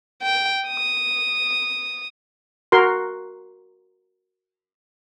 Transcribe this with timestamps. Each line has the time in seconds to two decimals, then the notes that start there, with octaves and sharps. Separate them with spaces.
0.22 G5
0.68 D#6
2.72 F#4 A#4 C6